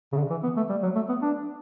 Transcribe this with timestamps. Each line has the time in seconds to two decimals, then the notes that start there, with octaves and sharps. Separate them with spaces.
0.12 C#3
0.17 D3
0.30 E3
0.43 B3
0.57 A3
0.69 G3
0.83 F#3
0.95 A3
1.09 B3
1.22 D4